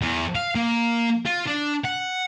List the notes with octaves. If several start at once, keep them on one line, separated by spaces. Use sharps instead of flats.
E2
F5
A#3
F4
D4
F#5